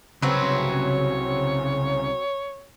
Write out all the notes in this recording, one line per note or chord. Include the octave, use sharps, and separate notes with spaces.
C2 C#3 F#3 C4 B4 C#5